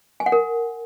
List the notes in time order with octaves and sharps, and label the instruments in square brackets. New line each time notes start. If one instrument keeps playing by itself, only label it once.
[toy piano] G#5
F#5
A#4